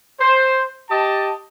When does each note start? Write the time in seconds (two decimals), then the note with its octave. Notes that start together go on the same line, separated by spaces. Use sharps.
0.20 C5
0.90 G4 D#5 A5